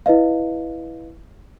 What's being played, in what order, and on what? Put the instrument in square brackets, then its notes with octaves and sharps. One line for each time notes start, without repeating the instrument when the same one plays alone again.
[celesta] E4 B4 D#5 F5